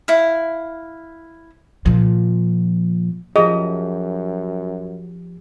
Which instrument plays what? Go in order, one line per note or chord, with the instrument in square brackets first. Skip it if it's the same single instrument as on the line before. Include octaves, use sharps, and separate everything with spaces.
[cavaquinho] E4 F5
[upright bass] A#2 F3
[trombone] F#2 [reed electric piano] F3 G4 [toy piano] G#4 [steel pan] D#5